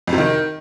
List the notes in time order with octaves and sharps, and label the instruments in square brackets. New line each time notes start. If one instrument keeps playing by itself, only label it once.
[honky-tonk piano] F2
C3
D#3